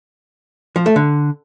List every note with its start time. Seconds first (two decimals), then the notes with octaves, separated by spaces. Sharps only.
0.76 F3
0.86 A3
0.96 D3